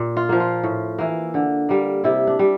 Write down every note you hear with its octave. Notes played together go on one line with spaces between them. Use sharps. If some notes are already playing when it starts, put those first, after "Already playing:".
Already playing: A#2
F4
F3 A#3
F4
A2
E3 A#3
D3
G3 A#3
C3 E4
D4
G3